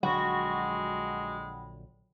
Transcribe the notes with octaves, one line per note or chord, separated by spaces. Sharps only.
A#1 D3 F#3 G#3 F#4 F#5 G5 B5